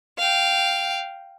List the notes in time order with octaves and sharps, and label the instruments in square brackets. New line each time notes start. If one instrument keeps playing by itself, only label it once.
[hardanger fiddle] F5 G5